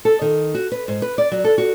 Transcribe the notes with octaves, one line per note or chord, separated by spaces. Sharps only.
A4
D#3
F#4
B4
G#2
B4
D5
F#3
A4
F#4